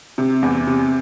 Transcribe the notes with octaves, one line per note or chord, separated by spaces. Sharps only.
C3
E2
C3